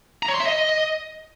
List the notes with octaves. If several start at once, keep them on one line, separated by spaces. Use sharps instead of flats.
A#5
C#5
C6
E5
D#5